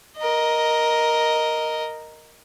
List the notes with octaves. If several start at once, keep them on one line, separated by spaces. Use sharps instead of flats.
A#4 D#5